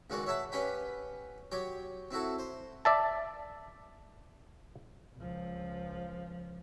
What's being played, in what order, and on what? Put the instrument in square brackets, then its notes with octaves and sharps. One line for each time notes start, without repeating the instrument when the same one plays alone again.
[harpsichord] C#2 G#2 D#3 G#3 F#4 D5
C#5 E5 F#5 A5 B5
C#4 G4 B4 F#5 G5 B5
F#3 G4 C#5 G5
C4 E4 F#4 A4
C5
[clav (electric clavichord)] D5 E5 A5
[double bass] C#2 F3